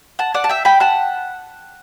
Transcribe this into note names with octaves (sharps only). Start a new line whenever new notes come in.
F#5 A5
D5 F#5
A5
E5 G5
G5 B5
F#5 A5